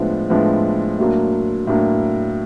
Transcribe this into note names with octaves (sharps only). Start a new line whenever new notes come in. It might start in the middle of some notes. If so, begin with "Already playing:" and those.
Already playing: A2 F3 G#3 B3 D4
A2 F3 G#3 B3 D4
A2 F#3 A#3 D4
A2 F#3 A#3 D4